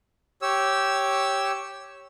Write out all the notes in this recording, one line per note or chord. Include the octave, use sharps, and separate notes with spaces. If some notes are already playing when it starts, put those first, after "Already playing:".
G4 C#5 E6